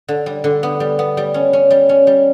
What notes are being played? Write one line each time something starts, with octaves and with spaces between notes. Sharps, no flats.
D3
G3
D3
B3
G3
B3
G3
C#4
C#4
G3
C#4
G3